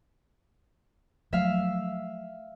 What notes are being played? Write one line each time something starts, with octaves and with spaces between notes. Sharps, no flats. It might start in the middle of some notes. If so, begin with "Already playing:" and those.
F3 F#3 A3 E5 F5